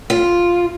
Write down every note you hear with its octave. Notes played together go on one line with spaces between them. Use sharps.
F4